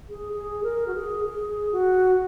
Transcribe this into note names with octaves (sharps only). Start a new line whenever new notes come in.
G#4
G#4
A#4
F#4
G#4
G#4
F#4